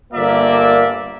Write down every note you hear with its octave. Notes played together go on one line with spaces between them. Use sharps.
G1 A#3 F4 A#4 D5 E5